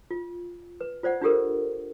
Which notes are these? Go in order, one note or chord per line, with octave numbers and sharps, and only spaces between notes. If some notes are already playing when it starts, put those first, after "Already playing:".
F4
B4
F4 C5 D5 F#5
D4 F4 G4 A4 A#4